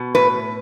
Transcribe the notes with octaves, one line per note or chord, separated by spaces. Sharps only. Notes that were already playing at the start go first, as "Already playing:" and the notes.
Already playing: B2
A2 B4